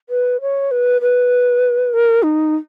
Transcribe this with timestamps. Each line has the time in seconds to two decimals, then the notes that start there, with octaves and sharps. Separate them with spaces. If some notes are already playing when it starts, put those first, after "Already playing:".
0.09 B4
0.41 C#5
0.71 B4
1.01 B4
1.93 A#4
2.23 D#4